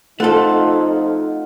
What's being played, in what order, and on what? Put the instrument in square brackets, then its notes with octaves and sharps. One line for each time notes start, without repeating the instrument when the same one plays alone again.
[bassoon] F2 [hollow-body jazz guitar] A3 A4 [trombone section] D#4 [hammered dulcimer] F4 F#5